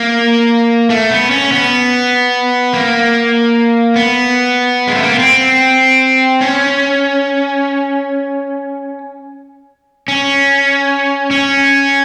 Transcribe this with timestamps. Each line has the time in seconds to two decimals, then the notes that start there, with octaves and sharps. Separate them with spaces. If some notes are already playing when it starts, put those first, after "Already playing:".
Already playing: A#3
0.90 A3
1.10 B3
1.31 C#4
1.52 B3
2.74 A#3
3.96 B3
4.87 G#3
4.95 A3
5.03 A#3
5.11 B3
5.19 C4
6.41 C#4
10.08 C#4
11.31 C#4